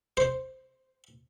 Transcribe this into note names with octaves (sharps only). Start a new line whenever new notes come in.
C5